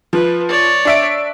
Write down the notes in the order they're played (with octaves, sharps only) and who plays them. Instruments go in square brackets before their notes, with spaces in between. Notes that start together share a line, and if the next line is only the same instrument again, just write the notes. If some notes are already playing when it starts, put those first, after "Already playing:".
[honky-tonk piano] F3 [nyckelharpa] B4
[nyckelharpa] C#5 D5
[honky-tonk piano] D4 E5 D7